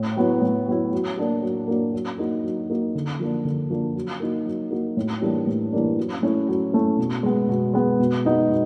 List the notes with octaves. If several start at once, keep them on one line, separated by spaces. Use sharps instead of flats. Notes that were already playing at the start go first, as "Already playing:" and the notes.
Already playing: A2
F#3 B3 E4
A2
F#3 B3 E4
F#3
A#3 D4 F#4
F#3
A#3 D4 F#4
F#3
A#3 D#4 F#4
F#3
A#3 D#4 F#4
D3
F3 A#3 D4
D3
F3 A#3 D4
F#3
A#3 D#4 F#4
F#3
A#3 D#4 F#4
A2
E3 G3 A#3 D4
A2
E3 G3 A#3 D4
F#3
A3 C#4 E4
F#3
A3 C#4 E4
B2
G#3 B3
B2
G#3 B3
B2
G#3 B3 D#4 F#4
B2